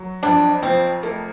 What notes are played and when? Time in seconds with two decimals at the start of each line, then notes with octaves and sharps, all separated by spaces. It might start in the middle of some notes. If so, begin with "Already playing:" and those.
Already playing: F#3
0.23 F2 D4
0.63 F3 C4
1.03 A3 A#3